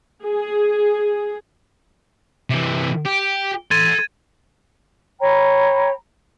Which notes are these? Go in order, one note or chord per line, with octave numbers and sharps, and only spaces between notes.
G#4
C3 E3
G4
A4 C6 G#6 A6 D#7
C#5 G5 A#5 B5